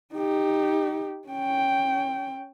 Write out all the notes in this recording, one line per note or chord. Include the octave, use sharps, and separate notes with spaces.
D#4 G4
C#4 G5